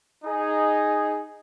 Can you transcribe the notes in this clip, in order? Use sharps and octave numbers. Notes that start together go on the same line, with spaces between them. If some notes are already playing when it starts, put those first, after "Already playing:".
D#4 G#4